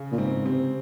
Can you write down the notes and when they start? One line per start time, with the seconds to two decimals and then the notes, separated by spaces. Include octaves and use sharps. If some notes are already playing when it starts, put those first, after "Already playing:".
Already playing: C#3
0.12 A#2
0.18 G#2 C4
0.46 C3 C4